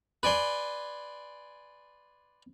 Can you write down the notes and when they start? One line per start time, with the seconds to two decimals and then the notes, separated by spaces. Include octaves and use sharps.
0.23 B4 D5 G#5 C6